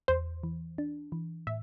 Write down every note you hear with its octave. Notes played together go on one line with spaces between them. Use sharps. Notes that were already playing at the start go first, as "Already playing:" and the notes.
E2 C5
E3
D4
E3
A2 E5